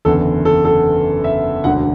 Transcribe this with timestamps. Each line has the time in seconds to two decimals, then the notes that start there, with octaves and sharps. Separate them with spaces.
0.05 F#1 E2 D3 A4
0.45 A4
0.65 A4
1.24 E5
1.64 E1 D2 D3 F#5